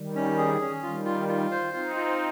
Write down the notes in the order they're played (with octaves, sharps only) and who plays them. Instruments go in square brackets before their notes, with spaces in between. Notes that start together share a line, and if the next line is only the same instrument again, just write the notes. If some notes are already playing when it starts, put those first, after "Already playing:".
Already playing: [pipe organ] D#3 G3
[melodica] C#4
G#4
C#4
[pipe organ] D#3 G3 [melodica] F4
[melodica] F4
F4
C5
[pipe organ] C4 D#4 [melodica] F4
[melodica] F4